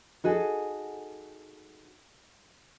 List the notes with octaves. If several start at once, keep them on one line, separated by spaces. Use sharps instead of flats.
D#4 F#4 G#4 A4